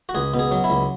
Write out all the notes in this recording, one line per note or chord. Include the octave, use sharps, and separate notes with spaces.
F#4
C#2 G#4
B2
G#4
F#3
E4
C#2